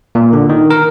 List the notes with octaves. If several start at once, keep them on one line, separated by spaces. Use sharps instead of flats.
A#2
D3
D#3
A#4